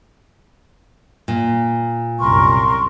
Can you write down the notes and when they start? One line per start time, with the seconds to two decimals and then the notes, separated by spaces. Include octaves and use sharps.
1.28 A#2
2.19 C2 F#2 A#4 C6 C#6